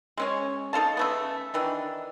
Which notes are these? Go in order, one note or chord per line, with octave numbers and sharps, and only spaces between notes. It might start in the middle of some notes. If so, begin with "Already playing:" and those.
G#3 C#4 C#5
D#4 A4 F5 A5
C#3 A3 B3
D#3 E3 D4